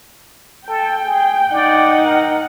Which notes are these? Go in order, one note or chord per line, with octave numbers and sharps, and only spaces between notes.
A4 G5
G#4
D#4 D5 F#5
A#4